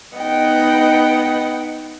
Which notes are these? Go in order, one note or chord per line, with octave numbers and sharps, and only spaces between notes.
B3 D#4 D#5 F#5 G5